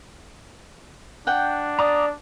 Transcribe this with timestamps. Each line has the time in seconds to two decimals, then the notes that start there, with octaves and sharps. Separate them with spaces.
1.27 D4 F#5 G5
1.79 D5 A#5 D6 D#6